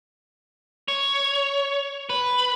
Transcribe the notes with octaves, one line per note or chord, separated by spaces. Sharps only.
C#5
B4